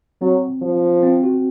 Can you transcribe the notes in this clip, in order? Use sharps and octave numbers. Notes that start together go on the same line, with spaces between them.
F#3 C4
F3
C4
F#4